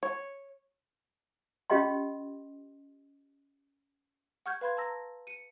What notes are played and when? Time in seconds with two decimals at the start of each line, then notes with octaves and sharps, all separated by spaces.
0.03 C#5
1.70 C#4 F4 G4 D#5 G5 C6
4.46 F#5 C#6 F6 G6 G#6
4.61 B4 F5 B5 C6 G#6
4.77 A5 A#5 E6 A#6
5.27 C#7 D#7